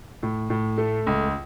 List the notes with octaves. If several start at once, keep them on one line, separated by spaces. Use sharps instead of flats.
A2
A2
A3
C#2